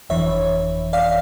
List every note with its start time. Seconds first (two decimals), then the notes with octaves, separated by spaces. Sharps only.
0.10 G1 F2 E3 C#5 E5
0.93 D5 F5